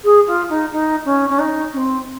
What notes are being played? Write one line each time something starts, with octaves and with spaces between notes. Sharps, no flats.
G#4
F4
D#4
D#4
C#4
C#4
D#4
C#4
C4